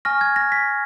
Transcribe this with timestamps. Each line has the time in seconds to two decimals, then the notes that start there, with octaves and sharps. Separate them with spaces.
0.05 G#5 C#6 F6 A#6
0.21 G#6
0.36 A#6
0.52 B6